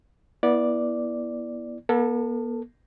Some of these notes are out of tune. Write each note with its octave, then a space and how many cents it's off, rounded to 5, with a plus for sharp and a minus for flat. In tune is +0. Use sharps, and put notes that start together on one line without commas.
B3 -25 E4 +0 D5 +0
B3 -45 A4 +15